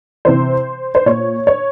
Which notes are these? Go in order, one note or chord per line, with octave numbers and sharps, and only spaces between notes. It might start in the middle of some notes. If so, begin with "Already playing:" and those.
C3 E3 C5
C5
A#2 C#5
C#5